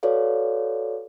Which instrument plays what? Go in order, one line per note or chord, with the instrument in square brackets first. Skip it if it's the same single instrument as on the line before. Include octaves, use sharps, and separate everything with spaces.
[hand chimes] F#4 A4 B4 C#5 D5 F5